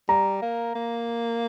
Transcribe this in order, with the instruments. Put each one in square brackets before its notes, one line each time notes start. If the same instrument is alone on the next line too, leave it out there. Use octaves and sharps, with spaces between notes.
[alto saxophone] G3 [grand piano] A#5
[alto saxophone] A#3
A#3